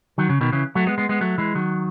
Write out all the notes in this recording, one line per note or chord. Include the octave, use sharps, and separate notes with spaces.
D#3 F#3
C#3
B2 D#3
C#3 E3
F#3 A3
G#3 B3
G#3 B3
G#3 B3
F#3 A3
E3 G#3
D#3 F#3